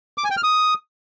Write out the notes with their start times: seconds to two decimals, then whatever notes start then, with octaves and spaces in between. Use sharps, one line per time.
0.18 D6
0.24 G#5
0.31 G5
0.37 F6
0.44 D#6